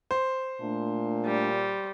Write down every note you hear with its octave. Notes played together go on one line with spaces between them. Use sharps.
C5
A#2 A3 D4
G3